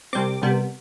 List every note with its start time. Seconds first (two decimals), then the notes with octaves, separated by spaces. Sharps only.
0.13 C2 C3 G3 C4 D6
0.42 C2 C3 G3 B3